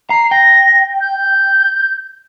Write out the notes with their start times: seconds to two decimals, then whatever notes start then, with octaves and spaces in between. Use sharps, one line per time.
0.10 A#5 C7
0.31 G5 A#6
1.00 G6